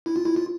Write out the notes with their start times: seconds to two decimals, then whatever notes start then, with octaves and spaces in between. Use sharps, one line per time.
0.06 E4
0.16 F4
0.25 E4
0.36 F4